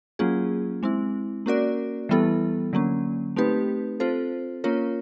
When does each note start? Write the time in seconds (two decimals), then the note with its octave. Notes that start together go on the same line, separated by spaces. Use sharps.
0.19 F#3 A#3 C#4 F4 G#4
0.83 G#3 C4 E4
1.46 A#3 C#4 F#4 A#4 D5
2.09 E3 G3 B3 E4 A4
2.73 D3 F#3 A#3 C#4
3.36 A3 C4 D#4 G4 B4
4.00 C4 F4 A4 C5
4.64 A#3 C#4 F4 A#4 C#5